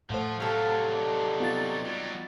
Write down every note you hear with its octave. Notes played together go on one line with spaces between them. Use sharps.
A2 F3 A3 C5 F#5
C3 F#3 G4 A4 F5
D#4 D5
B3 F4 A6
F#3 G3